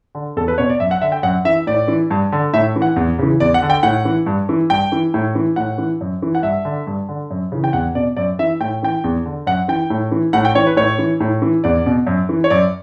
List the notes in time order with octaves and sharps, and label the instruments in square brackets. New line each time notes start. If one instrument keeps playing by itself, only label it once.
[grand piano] D3
E2 A4
B4
B2 C#5
D5
F#2 E5
F#5
D3 E5
G5
F#2 F#5
E3 E5
A2 D5
E3
G2
D3
A2 E5
E3
F#5
E2
C#3 E3
E2 D5
F#5
D3
G5
A2 F#5
E3
G2
E3
G2 G5
E3
A2
E3
A2 F#5
E3
F#2
E3
F#5
G2 E5
D3
G2
D3
F#2
C#3 E3
G5
E2 F#5
B2 D5
F#2 D5
E3 E5
A2 G5
E3 G5
E2
D3
F#2 F#5
E3 G5
A2
E3
A2 F#5
G5
E3 C#5
B4
A2 C#5
E3
A2
E3
E2 D5
B2
F#2
E3
C#5
F#2 D5